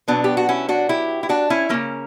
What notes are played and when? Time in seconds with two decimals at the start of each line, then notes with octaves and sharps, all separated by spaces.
0.08 B2 F#3 B3 D4
0.24 G4
0.37 F#4
0.49 C#4 E4
0.69 D4 F#4
0.89 E4 G4
1.23 E4
1.29 D4 F#4
1.50 C#4 E4
1.69 C#3 F#3 A#3 C#4